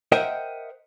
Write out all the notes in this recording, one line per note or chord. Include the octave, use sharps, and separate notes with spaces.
A#4 C5 D#5 E5 F#5 G5